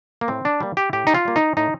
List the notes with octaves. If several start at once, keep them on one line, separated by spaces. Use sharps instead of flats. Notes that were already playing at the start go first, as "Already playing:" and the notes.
A#3
A2 C4
D4
G3 A#3
G4
A2 G4
D#4
F4
G3 A#3
D#4
A2 D#4